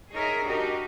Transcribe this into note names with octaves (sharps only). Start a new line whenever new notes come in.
D#4 G#4 A#4 C#5 E5
D4 D#4 F#4 G4 A#4